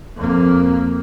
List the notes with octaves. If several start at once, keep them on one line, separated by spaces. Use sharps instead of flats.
F2 A#3